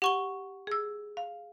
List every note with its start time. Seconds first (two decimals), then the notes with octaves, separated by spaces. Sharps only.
0.02 G4 F#5 C#6 G7
0.67 G#4 E6
1.17 F5